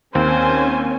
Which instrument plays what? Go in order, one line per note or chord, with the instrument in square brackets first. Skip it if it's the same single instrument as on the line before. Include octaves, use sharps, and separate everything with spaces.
[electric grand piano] D#2 [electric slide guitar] C4 [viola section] C#4 G#5 [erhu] C5